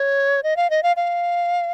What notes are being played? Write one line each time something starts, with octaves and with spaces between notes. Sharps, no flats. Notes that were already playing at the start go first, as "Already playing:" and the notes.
Already playing: C#5
D#5
F5
D#5
F5
F5